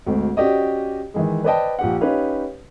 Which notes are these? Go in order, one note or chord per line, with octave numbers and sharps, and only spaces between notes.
G#1 D2 G#2
C#4 F#4 G4 D5 D#5
D#3 E3 G#3
B4 C5 D5 D#5 G5 A5
A#1 G4 F#5
C#4 D#4 G4 B4 C#5 F5